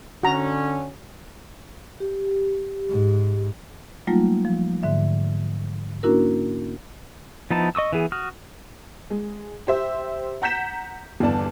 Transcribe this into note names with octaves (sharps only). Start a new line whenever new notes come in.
D3 C#4 F#4 A#5
G4
G#2
F#3 G3 A3 A#3 D#4 F4
F3
G#2 D3 E5
A#3 C#4 D4 E4 F#4 A#4
F3 B3 D#4 E4 A5
D#5 C#6 D#6 E6
E3 B3 G#4
F#4 D#6 F6
G#3
G4 C5 E5
F#5 A#5 G6 B6 E7
G1 E2 D5 A5